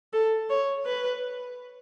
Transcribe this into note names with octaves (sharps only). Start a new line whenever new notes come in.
A4
C#5
B4